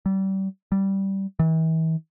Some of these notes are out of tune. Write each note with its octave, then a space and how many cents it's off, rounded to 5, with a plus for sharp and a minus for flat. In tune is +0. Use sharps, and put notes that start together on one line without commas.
G3 -30
G3 -15
E3 -40